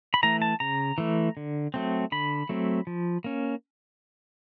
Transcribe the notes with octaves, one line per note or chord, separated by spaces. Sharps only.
B5
E3 A3 A#5
A5
C#3 A#5
E3 A3
D3
F#3 A3 C4
D3 B5
F#3 A3 C4
F3
A#3 C#4